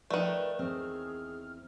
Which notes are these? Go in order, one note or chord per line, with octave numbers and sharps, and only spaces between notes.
D#3 F3 A3 A#4 B4 D5 G5
E2 G#2 C4 G#4 F6